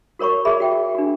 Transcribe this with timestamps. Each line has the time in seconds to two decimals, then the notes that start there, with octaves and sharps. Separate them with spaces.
0.19 F#4 A#4 C#5 B5 C#6
0.45 G#4 A#4 D5 E5 B5
0.60 F#4 G5
0.95 D4 F#4